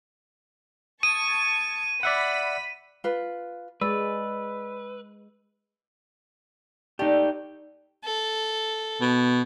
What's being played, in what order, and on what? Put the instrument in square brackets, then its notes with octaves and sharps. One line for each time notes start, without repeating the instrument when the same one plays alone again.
[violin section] A5 C#6 G#6 [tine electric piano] D#6 [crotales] D#7
[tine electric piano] D5 E5 F#5 [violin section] B5
[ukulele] F4 B4
[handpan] G#3 [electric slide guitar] B4 [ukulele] D5 [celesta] E6
[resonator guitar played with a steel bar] A3 D5 [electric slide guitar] D#4 G4
[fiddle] A4
[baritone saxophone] B2